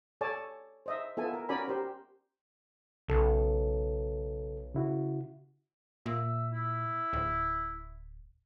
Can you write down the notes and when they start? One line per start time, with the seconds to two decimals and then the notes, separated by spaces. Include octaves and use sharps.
0.21 A4 C#5 D5 G#5 A5
0.86 C5 D#5 E5
1.17 B3 F4 A4 E5 G#5
1.33 A#4
1.49 C#4 F#4 A#4 D5 G#5 B5
1.68 G4 A#4 C5
3.08 B1 C#3 A4
4.75 C#3 E4 F#4
6.06 A#2 E5
6.52 E4
7.13 D1